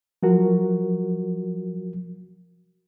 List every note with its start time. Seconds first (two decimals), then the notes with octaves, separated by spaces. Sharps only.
0.23 F3 F#3 F#4 A#4